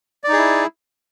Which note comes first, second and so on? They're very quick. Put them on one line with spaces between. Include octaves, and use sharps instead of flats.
D5 D#4 G#4 E4